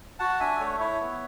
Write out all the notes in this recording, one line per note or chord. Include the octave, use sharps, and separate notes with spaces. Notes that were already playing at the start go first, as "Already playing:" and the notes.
F#4 F#5 A5
D4 E5 G#5
A3 C#5 E5
E4 C#5 E5
B3